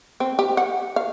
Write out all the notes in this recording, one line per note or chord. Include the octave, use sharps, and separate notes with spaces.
C4
G4
F#5
F5